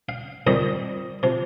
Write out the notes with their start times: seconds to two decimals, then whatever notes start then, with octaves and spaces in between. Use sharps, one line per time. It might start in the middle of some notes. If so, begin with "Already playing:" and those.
0.09 F5
0.47 F2 D#3 G3 C4 D#5
1.23 C3 F3